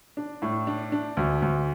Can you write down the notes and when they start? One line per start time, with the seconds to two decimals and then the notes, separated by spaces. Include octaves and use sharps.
0.17 D4
0.42 A2
0.67 D4
0.92 D4
1.17 D2
1.42 D2